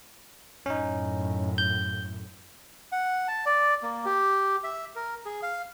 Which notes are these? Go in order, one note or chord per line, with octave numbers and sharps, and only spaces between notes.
F#2 A2 C#4 D#4
G6
F#5
A5
D5
A#3
G4
E5
A#4
G#4
F5